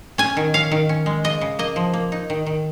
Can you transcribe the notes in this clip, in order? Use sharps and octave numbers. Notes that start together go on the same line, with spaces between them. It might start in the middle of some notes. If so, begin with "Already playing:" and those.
C#4 G#5
D#3
C#4 F5
D#3
C#4
G#3
C#3 D#5
C#3
A#3 D#5
F3
A#3
D#4
D#3
D#3